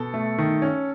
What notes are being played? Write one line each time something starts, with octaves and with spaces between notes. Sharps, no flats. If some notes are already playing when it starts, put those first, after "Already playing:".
Already playing: B2 A4
A3
D#3
C#4